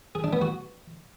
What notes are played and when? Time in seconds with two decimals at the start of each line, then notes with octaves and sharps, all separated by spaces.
0.15 G#4
0.24 D4
0.33 B3
0.42 F#4